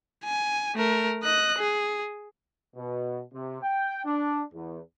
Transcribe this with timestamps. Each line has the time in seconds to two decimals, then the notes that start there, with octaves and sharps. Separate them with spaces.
0.25 G#5
0.75 A3 A#4
1.23 D#5 F#6
1.59 G#4
2.76 B2
3.33 C3
3.62 G5
4.05 D4
4.53 E2